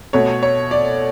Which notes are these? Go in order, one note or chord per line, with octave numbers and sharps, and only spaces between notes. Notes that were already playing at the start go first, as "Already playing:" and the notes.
B2 A3 C#5
C#5
D5